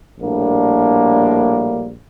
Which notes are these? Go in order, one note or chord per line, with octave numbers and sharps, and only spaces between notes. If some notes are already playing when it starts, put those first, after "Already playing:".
A#1 A2 G3 A#3 D4